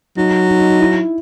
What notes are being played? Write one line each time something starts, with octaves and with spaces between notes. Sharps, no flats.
F#3 D#4
D#4
D#4
D#4
E4